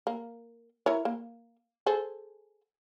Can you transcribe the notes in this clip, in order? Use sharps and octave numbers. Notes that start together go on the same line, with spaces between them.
A#3
E4 A#4 C#5
A#3
G#4 A4 C5